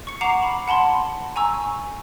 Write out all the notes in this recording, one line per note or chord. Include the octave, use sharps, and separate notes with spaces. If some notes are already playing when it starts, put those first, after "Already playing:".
C#6 C#7
F#5 A#5 D6 C7 E7 F7
B5
F#5 A5 B5 C6
G#5 A#5 C#6 E6